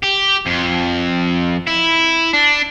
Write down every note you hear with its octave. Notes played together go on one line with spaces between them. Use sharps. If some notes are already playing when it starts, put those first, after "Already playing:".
G4
F2
E4
D4